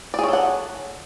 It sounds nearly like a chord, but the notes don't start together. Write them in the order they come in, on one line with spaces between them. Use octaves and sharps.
D5 G#4 C#5 A4 F#5